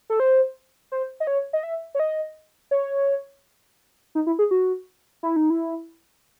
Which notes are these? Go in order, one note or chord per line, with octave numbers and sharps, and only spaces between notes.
A4
C5
C5
D#5
C#5
D#5
E5
C#5
D#5
C#5
D#4
E4
G#4
F#4
E4
D#4
E4